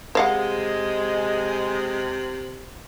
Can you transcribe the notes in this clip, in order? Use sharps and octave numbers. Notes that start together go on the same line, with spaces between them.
C3 G#3 C5 F5 F#5